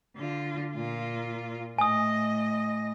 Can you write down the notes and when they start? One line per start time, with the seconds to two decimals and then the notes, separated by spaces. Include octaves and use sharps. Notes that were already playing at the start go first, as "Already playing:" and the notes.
0.16 D3 F4
0.74 A#2 F4
1.79 A2 D#5 G#5 D#6